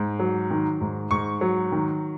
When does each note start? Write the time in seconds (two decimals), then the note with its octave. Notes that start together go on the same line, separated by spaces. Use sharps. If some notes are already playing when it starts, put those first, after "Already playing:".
Already playing: G#2
0.19 F#3
0.50 D#3
0.81 G#2
1.11 G#2 C#6
1.41 F#3
1.72 D#3